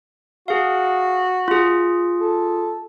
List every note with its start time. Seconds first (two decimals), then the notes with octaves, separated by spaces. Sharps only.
0.48 F#4 G#4 F5
1.48 F4 G#4
2.21 A4